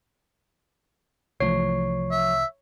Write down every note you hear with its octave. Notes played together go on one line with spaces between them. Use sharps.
C2 E3 F3 A3 C#5 C7
E5